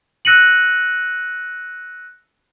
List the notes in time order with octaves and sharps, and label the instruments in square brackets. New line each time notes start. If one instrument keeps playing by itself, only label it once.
[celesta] E6 F#6 A#6 C#7 D#7 F#7